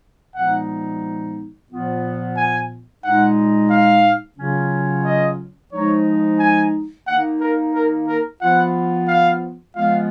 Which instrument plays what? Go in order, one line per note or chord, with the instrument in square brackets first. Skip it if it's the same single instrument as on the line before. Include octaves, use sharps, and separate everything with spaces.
[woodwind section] A#2 F3 G#3 B3 D#4 [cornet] F#5
[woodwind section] A#2 F3 B3 F4
[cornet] G#5
[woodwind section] A#2 G#3 D#4 [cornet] F#5
[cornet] F5
[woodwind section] C#3 F#3 C#4 F4
[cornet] D#5
[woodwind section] F3 G#3 D#4 [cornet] C#5
[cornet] G#5
[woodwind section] D#3 A#3 D#4 [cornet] F#5
[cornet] A#4
A#4
A#4
[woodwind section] F3 B3 F4 [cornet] F#5
[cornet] F5
[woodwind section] F3 G#3 B3 F4 [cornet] F5